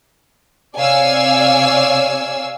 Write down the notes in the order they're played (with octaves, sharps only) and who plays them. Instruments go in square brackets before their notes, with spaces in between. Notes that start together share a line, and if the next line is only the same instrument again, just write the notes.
[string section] C3 C#5 D5 F5 G#5 E6